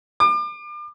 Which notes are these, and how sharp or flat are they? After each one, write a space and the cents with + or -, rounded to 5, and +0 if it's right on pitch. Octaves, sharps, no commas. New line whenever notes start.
D6 +35